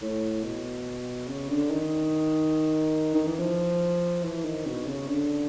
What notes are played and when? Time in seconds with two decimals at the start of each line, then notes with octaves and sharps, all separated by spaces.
0.02 A2
0.43 B2
1.28 C#3
1.49 D3
1.70 D#3
3.15 D#3
3.27 E3
3.39 F3
4.23 E3
4.45 D#3
4.66 B2
4.87 C#3
5.08 D3